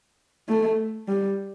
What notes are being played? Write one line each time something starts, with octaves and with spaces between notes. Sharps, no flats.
A3
G3